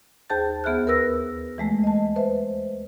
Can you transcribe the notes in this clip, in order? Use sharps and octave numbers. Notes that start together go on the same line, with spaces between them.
D#2 G#4 C5 A5 G6 A6
D2 B3 G#4 E5 F6 F#6
A#4 B4 E6 A#6
E3 G#3 A3
D#5 A5
B4 C5 E5